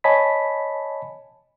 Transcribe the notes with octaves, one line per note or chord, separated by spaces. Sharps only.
C#5 D#5 G#5 A5 B5 B6